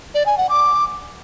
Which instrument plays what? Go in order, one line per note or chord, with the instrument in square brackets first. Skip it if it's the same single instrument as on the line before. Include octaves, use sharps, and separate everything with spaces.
[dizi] D5
G#5
F#5
D6